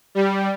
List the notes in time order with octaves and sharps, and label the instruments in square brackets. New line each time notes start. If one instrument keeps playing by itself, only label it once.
[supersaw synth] G3